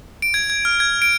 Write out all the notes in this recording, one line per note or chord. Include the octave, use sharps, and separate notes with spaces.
D7
G#6
G#6
F6
G#6
D7